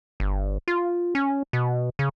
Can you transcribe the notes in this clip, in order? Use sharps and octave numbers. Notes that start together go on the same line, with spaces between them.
G1
F4
C#4
B2
C#3